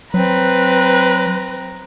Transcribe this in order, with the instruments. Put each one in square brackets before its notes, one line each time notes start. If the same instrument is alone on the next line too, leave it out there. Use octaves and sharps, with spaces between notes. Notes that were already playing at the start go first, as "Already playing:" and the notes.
[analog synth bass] F#3 [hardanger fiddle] C4 A#5 [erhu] B4